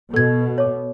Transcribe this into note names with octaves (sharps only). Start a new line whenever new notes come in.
B2 A4 G#6
C#5 D6